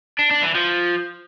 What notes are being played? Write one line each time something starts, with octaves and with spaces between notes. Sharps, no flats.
D4
D4
E3
F3